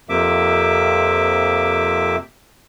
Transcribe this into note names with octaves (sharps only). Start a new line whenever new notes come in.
F2 C3 F3 A#3 E5 D6